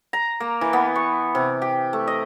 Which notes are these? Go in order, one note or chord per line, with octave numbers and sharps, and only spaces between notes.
A#5
A#3
E3
B3
C#6
C3
G4
A3
D#5